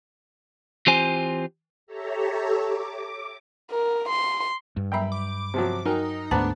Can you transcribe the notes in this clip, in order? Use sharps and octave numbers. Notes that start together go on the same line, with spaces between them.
E3 C4 F4 G4 C5 G#5
G4 A4 C#5 E5 A#5
D6
A#4
C6
G2
F#3 G3 E5 G5 A#5 B5
D6
C3 F3 F#3 C5
F#3 D#4 A#4 G5 G#5
D2 G#2 A3 B3 D4 C5 A5 A#5